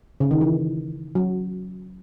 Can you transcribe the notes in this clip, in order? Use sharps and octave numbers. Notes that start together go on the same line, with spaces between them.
C#3
D#3
E3
F#3